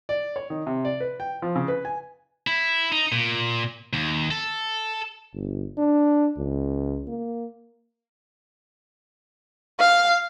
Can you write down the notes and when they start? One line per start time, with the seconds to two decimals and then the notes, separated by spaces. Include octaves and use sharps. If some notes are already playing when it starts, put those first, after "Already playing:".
0.09 D5
0.36 C#5
0.50 D#3
0.67 C3
0.85 D5
1.01 B4
1.20 G5
1.42 F3
1.56 C#3
1.68 B4
1.85 G#5
2.47 E4
2.92 D#4
3.12 A#2
3.93 D#2
4.31 A4
5.33 G1
5.78 D4
6.37 C#2
7.08 A#3
9.79 F5